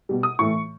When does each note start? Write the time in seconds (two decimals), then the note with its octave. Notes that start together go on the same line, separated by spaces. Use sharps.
0.09 B2 G3
0.23 D#6
0.39 A2 E3 A3 C#6